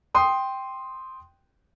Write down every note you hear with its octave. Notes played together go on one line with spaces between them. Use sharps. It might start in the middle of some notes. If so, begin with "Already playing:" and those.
G5 C6 D#6